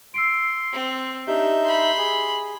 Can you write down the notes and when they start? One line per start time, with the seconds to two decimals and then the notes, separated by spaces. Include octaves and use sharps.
0.14 C6 E6 C7 D7
0.73 C4
1.27 D4 D#4 G4 E5 G6
1.65 B5 C6
1.98 G#4